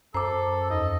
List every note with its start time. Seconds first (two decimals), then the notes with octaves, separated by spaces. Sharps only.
0.14 F#2 A4 C5 A#5 D6
0.70 E2 D#5